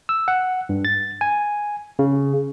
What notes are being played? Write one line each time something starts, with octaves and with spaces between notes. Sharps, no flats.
E6
F#5
G2
A6
G#5
C#3